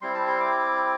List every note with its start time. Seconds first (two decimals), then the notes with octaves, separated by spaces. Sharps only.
0.01 G3 C4 E4 C6
0.14 A5
0.27 C6
0.40 D6